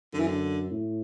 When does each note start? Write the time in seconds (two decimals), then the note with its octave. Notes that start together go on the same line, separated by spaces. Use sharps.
0.13 F#2 D3
0.20 E3
0.27 D3
0.71 A2